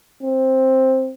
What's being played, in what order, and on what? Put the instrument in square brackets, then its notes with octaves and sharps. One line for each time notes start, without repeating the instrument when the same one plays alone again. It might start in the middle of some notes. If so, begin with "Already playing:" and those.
[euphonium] C4